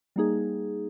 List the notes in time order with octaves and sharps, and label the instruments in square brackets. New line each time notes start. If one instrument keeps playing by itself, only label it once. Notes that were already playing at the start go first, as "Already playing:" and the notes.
[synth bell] G3 A#3 D#4 G#4